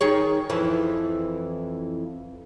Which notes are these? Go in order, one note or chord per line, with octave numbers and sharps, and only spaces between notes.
D#3 G#4 C#5
F2 E3